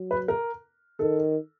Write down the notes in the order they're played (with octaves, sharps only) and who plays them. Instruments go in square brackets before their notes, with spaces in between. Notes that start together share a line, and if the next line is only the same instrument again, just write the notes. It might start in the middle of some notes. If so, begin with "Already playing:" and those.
Already playing: [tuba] F#3
[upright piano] B4
A#4
[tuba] D#3 [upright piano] A4